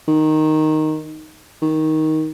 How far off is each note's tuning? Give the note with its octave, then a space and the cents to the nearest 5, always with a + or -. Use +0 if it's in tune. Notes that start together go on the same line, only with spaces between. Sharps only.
D#3 -5
D#3 +10